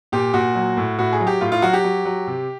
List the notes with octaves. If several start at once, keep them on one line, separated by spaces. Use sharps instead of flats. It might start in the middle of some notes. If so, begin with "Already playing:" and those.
A#2 G4
A#2 F#4
F#3
A2
A2 F#4
G#4
F#3
G4
A2 F4
F4
F#3 F#4
G4
F#3
F#3
C3